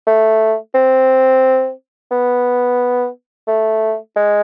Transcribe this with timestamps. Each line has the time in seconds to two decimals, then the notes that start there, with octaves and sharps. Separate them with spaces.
0.07 A3
0.75 C4
2.11 B3
3.47 A3
4.16 G#3